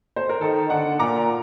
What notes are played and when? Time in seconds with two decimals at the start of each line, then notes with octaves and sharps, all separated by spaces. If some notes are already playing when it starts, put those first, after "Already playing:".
0.16 C5
0.29 A#4
0.41 D#3 A4
0.70 D3 D5 F#5
0.99 A#2 A#5 D6